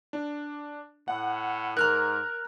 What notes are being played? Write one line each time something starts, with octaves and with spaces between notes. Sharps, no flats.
D4
A2 F#5
G#2 A#4 A#5 F6 F#6